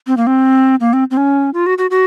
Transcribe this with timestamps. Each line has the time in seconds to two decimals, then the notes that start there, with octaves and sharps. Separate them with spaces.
0.07 C4
0.17 A#3
0.27 C4
0.80 A#3
0.93 C4
1.11 C4
1.17 C#4
1.54 F4
1.66 F#4
1.78 F#4
1.91 F#4